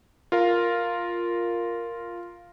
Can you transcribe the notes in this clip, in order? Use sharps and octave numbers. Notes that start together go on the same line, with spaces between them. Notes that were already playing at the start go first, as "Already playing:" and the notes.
F4 A#4 F5